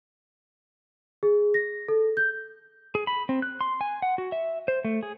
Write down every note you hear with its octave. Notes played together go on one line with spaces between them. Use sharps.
G#4
A#6
A4
G6
G#4
B5
C4
F#6
C6
G#5
F#5
F#4
E5
C5
A3
G#4